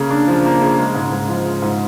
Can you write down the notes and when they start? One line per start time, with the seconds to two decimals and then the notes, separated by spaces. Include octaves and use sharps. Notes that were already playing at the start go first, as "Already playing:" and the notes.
Already playing: C#3 A#3
0.11 D4
0.28 F3
0.45 A#3
0.62 C#3
0.78 G#3
0.95 G#2
1.12 G#2
1.28 F3
1.45 G#3
1.62 G#2